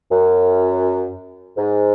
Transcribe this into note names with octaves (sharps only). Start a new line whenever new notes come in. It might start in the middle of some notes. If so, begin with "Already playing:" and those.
F#2
G#2